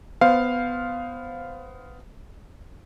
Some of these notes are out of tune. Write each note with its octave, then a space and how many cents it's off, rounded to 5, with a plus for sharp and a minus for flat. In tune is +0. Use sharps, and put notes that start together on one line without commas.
B3 +15 C5 +0 F5 +0